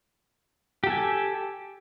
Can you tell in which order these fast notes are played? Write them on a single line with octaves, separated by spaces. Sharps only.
G4 A4 G#5